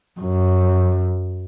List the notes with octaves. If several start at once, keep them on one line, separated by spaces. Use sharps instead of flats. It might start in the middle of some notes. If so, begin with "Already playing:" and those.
F#2